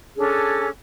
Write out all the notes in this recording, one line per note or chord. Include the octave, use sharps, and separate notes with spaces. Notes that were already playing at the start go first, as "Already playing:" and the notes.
C#4 D4 G#4 A4